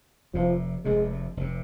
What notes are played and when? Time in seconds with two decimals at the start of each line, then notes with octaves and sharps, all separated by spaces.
0.34 F1 F2 C3 F3
0.85 F1 F2 C3 G#3
1.37 F1 C3